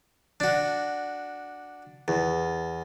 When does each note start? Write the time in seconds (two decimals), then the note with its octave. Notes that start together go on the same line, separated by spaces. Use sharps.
0.40 D4 F#4
2.08 E2